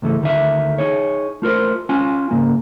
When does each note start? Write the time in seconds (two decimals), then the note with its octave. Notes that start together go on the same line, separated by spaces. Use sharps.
0.02 C#2 G#2 E3 A3
0.21 D2 D#3 E5
0.78 D#4 G#4 C#5
1.42 A3 F4 A#4 C5
1.89 C#4 F4 F5 G#5
2.31 G#2 C#3 A#3